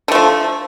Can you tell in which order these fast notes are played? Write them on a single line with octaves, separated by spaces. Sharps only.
D3 A3 F3